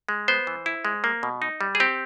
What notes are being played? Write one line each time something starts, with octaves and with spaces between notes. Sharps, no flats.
G#3
B3 C5
E3
E4
G#3
A#3
B2
D#4
G3
G#4
C4 G4